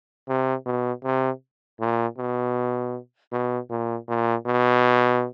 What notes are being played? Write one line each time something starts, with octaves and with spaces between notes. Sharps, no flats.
C3
B2
C3
A#2
B2
B2
A#2
A#2
B2